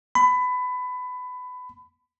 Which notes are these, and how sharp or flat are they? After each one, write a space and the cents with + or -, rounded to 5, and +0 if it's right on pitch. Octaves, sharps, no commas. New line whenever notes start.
B5 +20